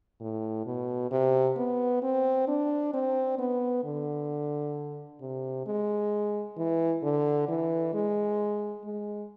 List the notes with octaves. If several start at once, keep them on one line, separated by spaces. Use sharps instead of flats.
A2
B2
C3
B3
C4
D4
C4
B3
D3
C3
G#3
E3
D3
E3
G#3
G#3